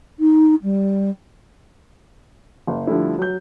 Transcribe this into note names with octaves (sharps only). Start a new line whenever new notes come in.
D#4
G3
F#1
D3 F3 G3 A3 E4
F#3 G6